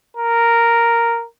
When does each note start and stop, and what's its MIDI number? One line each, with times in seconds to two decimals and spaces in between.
0.17 1.24 70